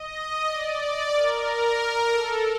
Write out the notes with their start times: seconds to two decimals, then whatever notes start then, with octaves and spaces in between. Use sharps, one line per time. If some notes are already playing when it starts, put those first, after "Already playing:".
Already playing: D#5
0.47 D5
1.12 A#4
2.10 A4